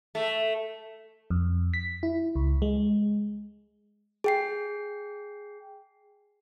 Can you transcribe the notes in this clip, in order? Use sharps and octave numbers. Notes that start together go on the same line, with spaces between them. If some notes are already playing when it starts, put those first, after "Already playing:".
A3
F2
B6
E4
C#2
G#3
G#4 G5 C7